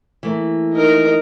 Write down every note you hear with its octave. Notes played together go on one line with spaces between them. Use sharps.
E3 A3 A#3
D#4 A#4